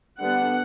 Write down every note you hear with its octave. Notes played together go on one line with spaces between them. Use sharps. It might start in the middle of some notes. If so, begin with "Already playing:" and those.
D3 G3 B3 D4 F#5